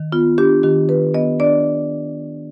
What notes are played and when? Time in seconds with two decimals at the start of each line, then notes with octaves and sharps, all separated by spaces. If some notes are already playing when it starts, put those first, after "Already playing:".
Already playing: D#3
0.12 B3 F4
0.38 D4 G4
0.63 D#3 G4
0.89 D#3 B4
1.14 B3 D#5
1.40 D4 D5